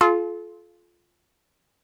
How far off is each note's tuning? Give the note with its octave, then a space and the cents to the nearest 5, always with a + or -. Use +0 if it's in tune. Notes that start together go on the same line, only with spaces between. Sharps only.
F4 +0 A4 -40